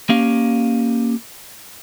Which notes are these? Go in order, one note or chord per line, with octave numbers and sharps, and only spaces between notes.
A#3 C#4 G4 F5